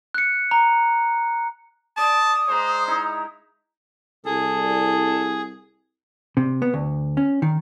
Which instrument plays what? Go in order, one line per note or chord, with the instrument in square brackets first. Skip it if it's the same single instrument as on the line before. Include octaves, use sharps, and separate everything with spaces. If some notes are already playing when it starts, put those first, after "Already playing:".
[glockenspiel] F#6 C#7
A#5
[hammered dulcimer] D5 [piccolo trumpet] A5 [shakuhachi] D#6
[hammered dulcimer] G#3 A#5 [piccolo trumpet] C5
[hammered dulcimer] D#4 E4
[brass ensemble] C2 [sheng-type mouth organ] G#4 [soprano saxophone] A4
[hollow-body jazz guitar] C3
B3
D2
C#4
D#3